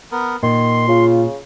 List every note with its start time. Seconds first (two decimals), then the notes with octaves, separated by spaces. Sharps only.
0.12 B3 A#4
0.43 A#2 D#3 C6
0.88 C#3 F4